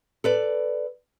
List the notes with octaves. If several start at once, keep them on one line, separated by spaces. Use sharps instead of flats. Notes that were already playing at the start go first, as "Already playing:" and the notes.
A4 B4 D5